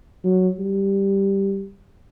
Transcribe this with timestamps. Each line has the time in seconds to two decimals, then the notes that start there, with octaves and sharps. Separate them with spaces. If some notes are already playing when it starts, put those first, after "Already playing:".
0.24 F#3
0.59 G3